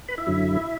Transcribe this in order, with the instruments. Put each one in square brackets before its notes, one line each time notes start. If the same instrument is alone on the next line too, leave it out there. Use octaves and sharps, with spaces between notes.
[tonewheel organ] B4 B5
E4 E5
F#2 D3 F#3